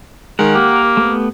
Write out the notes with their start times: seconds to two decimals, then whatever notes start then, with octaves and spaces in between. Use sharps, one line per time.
0.39 D#3 G#3 A#4 F#5
0.55 A#3 G4
0.97 A3 B3